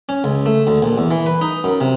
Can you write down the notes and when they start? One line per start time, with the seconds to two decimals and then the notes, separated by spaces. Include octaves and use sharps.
0.09 C#4
0.24 C#2
0.46 A3
0.67 D2
0.82 A#1
0.98 E2
1.11 E3
1.26 B4
1.41 D#4
1.64 F#2
1.81 C3